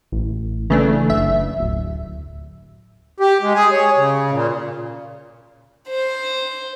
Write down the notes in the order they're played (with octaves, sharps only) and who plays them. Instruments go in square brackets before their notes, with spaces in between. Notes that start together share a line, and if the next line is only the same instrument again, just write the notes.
[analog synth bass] A1
[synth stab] C#3 A3 D4 [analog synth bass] E3
[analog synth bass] F#1 [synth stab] E5
[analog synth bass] D1
[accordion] G4
G#3
G#4
C#5
C#3
A#2
[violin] C5